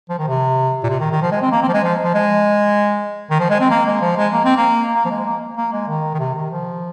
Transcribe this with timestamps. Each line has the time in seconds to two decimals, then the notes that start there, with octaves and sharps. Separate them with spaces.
0.09 F3
0.19 D#3
0.28 C3
0.84 A#2
0.90 C3
1.00 D#3
1.11 D#3
1.22 F3
1.32 G#3
1.42 C4
1.52 A#3
1.63 C4
1.68 F3
1.73 G#3
1.84 F3
2.03 F3
2.14 G#3
3.31 D#3
3.39 F3
3.50 G#3
3.60 C4
3.70 A#3
3.86 G#3
4.01 F3
4.17 G#3
4.33 A#3
4.45 C4
4.57 A#3
4.95 A#3
5.05 F3
5.10 G#3
5.26 A#3
5.57 A#3
5.73 G#3
5.88 D#3
6.14 D#3
6.19 C3
6.35 D#3
6.51 F3